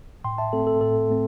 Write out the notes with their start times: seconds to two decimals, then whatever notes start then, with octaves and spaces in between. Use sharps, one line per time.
0.24 A2 G5 C6
0.38 E5 A5
0.53 A3 C4 A4
0.67 A4
0.81 A2 A4
1.10 A3 C4